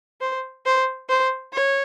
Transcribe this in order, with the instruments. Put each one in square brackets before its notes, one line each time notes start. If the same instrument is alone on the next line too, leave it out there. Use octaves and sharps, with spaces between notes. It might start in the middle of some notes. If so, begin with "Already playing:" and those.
[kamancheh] C5
C5
C5
C#5